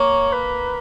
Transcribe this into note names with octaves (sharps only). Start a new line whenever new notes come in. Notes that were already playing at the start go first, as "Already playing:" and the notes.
Already playing: A#3 C#5
B4